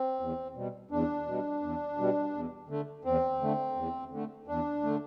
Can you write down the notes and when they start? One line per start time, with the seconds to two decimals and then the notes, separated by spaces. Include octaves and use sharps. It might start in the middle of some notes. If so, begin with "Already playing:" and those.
Already playing: C4
0.20 E2
0.56 B2 G3
0.91 E2 D4
1.26 B2 G3
1.62 E2
1.97 B2 G3
2.33 E2
2.69 D3 A3
3.05 E2 C4
3.41 D3 A3
3.76 E2
4.11 D3 A3
4.48 E2 D4
4.83 D3 A3